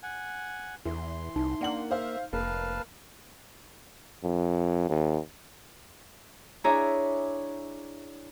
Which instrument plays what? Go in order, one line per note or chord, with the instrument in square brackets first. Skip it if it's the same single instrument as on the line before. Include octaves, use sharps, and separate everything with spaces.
[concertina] F#5 G#5
[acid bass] E2 [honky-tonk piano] E3 [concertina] C6
[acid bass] C2 [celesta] D#4
[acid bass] A#3 [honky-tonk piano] D4 F#5 F#7
[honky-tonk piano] C5 F5 [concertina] E5
[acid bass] F1 [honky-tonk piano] A#3 [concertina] B4 F5 A5
[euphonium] F2
D#2
[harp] D4 E4 G#4 C#5 E5 A#5